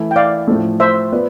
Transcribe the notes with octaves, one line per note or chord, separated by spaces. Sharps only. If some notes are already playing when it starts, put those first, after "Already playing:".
Already playing: E3 A3 E4
G5
D5 F5
A2 F3 A3
C5 E5
B3 F4 B4 D5